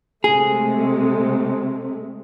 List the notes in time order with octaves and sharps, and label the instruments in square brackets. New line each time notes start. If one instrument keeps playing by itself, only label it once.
[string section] C3 G#3 A3 [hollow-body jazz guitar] G#4